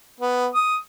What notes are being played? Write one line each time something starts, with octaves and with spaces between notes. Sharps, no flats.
B3
D#6